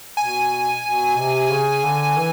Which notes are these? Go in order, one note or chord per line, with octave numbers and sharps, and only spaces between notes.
B2 G#5
B2
C3
C#3
D3
E3